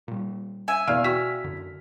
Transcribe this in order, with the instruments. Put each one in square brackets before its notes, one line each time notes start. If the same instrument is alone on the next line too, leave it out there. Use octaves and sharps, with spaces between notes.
[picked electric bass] A#2 G3
[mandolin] E5 G#5
[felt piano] E2 F6 [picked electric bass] B2 [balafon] D5 F5
[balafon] F#4 G5 C#6 [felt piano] B6
[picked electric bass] F#2 D3